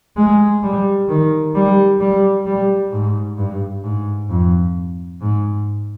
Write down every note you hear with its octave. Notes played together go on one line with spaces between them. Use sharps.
G#3
G3
D#3
G3
G3
G3
G#2
G2
G#2
F2
G#2